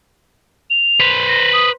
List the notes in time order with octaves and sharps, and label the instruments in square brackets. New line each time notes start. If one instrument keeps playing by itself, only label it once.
[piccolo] F7
[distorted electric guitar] B4 C5
[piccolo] A#6
D#6